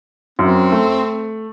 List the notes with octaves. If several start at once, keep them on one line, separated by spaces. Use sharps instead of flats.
F#2 C4
A3